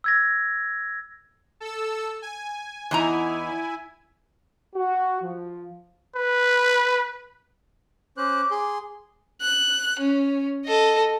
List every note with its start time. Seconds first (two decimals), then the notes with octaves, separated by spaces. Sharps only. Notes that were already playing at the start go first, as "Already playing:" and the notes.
0.04 E6 G#6 A#6
1.60 A4 E6
2.22 G#5
2.91 E2 D#4 E4 G#5 A#5
4.75 F#4
5.21 F3
6.16 B4
8.17 C#4 C5 D6 F#6
8.51 G#4 C6
9.42 F#6
10.00 C#4
10.66 A4 D#5